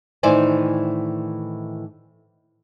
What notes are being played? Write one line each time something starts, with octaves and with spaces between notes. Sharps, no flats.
A2 D#3 E3 C5 D5 G#5